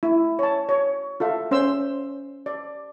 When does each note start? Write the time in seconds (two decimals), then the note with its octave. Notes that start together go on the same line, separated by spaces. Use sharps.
0.03 E4
0.39 C#5 A5
0.69 C#5
1.20 F4 A4 E5 F5
1.51 C#4 C5 C6 E6
2.46 D5